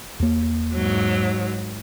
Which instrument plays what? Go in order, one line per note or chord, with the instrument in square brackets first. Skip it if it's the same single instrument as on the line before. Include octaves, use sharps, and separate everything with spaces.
[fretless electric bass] E2 A#3
[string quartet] G#2 F#3